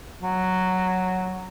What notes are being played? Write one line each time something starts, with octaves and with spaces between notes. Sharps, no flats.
F#3